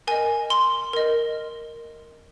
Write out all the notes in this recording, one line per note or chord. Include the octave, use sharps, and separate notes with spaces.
A#4 D#5 G#5
C6
A#4 D#5